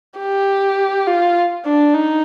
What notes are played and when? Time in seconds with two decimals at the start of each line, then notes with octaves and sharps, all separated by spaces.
0.19 G4
1.07 F4
1.66 D4
1.94 D#4